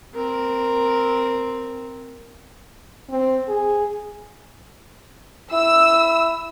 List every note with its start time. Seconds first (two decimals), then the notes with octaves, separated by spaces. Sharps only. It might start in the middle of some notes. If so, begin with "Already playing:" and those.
0.15 C4 A#4
3.10 C4
3.48 G#4
5.53 E4 E6